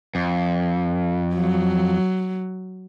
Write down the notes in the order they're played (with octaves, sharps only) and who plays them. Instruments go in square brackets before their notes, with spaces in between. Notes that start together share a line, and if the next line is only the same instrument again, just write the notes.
[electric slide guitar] F2
[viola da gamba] F#3